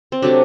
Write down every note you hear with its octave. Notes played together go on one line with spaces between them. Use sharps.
C4
C3 F#3 A3 D4